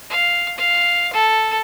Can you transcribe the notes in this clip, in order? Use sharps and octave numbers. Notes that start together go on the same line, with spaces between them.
F5
F5
A4